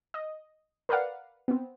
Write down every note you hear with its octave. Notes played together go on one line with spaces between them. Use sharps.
D#5
A#4 B4 D5 F5 F#5
B3 C4